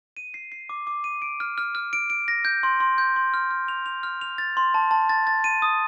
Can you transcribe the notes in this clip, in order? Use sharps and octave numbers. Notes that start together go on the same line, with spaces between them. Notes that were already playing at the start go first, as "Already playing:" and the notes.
D#7
C7
C7
D6
D6
D#7
D7
F6
F6
F6
D7
D7
A#6
G6
C6
C6
G6
C6
F6
F6
F7
F7
F6
F7
A6
C6
A5
A5
A6
A6
D#7
D#6